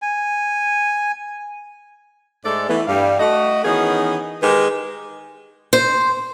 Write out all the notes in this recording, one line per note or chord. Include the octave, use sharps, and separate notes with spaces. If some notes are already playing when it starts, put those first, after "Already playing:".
G#5
G#2 G#3 A3 A4 D5
E3 A3 B3
G2 G3 F5
A3 F#4 D#5
D#3 E3 B3 C#4 D#4 G#4
D#3 G#3 G4 A#4 B4
C5